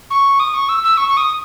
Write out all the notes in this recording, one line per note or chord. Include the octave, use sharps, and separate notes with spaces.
C#6
D#6
C#6
E6
E6
C#6
C#6
D#6